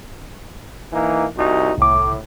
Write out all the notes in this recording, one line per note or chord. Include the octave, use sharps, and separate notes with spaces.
E3 A#3 D#4
C2 D#4 F#4
C2 A2 D6